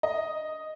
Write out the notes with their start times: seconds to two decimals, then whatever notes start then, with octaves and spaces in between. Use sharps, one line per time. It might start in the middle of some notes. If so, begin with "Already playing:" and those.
0.03 D#5